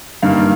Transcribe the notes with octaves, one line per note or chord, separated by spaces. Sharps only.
G2 D#3 A#3 F5